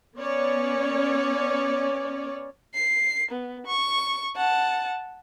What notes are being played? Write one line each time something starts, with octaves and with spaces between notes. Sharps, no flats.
B3 C#4 C#5 D5
C7
B3
C#6
F#5 A5